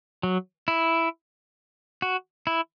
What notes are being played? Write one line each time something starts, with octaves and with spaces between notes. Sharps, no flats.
F#3
E4
F#4
E4